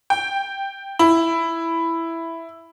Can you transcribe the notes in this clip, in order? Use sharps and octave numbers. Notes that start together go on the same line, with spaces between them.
G5
E4